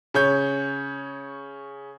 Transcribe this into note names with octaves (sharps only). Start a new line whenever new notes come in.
C#3 C#5 G6